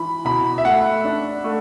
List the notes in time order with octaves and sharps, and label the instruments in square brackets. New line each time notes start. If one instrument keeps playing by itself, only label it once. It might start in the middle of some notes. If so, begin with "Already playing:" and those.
Already playing: [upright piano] E3 [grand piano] B5
[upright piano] B2 [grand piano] B5
[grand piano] E5
[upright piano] A3 [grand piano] F#5
[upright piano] D4
A3